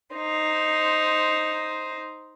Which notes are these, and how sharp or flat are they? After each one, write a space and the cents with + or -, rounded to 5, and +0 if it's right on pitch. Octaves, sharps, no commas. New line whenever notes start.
D#4 +0 C5 +0